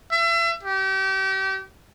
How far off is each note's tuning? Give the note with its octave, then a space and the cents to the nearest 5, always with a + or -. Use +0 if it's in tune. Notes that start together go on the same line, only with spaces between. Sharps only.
E5 +35
G4 -35